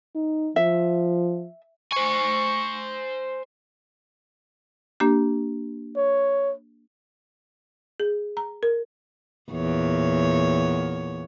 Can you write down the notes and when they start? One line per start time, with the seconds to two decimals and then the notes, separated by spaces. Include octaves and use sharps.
0.15 D#4
0.56 F3 E5
1.92 C5 G#5 C#6
5.00 A#3 D4 G4
5.96 C#5
8.00 G#4
8.37 A#5
8.63 A#4
9.52 E2 A#2 C#5